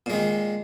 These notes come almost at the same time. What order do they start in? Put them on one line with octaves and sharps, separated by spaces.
A#2 G#3 D#3